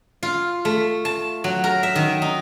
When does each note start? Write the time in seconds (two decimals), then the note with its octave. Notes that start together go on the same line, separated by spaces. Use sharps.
0.23 F4
0.65 A3
1.05 A5
1.44 F#3
1.64 A#4
1.83 E5
1.96 D#3
2.22 D#4